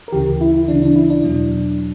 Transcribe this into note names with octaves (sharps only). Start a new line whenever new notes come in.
A#4
D2 C#3 E3 G4
E4
D2 C#3 E3 D4
D4
E4
D4
E2 B2 F#3